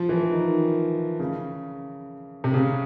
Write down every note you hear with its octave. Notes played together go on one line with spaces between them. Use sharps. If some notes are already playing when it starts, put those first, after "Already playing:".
Already playing: F3
E3
D#3
C#3
C3
C#3